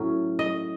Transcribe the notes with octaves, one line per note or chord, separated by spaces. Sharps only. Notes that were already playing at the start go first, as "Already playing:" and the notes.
Already playing: A2 F#3 C#4
D#5